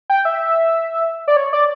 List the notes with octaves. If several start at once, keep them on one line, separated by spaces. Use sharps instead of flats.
G5
E5
D5
C#5
D5